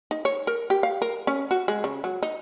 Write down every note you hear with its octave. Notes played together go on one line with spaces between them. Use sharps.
D#4
C#5
A#4
G4
F5
A#4
C#4
F#4
G#3
C#3
F#3
D#4